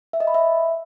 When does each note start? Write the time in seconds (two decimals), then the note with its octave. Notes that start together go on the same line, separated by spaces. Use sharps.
0.13 E5
0.20 D#5
0.27 B5
0.34 E5